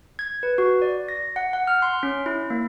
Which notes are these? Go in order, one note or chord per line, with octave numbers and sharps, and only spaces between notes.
G#6
B4
F#4
D5
A#6
F#5
F#5
F6
C6
C#4
E4
A#3